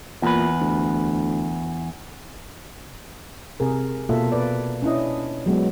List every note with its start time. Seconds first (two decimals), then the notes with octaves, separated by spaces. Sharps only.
0.22 E2 A#2 B4
0.61 D2
3.60 C3 G#4 A#4
4.09 B2 A#3 F4 A4 E5
4.32 B4 D5
4.82 C#4 D4 E4 D#5
5.46 F#3 G#3 B3